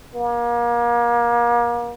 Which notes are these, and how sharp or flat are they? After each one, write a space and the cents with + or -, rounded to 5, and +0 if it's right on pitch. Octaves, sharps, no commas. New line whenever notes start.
A#3 +35